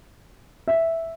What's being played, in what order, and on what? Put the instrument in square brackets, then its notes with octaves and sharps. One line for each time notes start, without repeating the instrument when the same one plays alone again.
[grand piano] E5